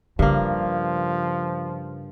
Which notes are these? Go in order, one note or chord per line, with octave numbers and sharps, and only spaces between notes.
G2 C#3 F3 A#3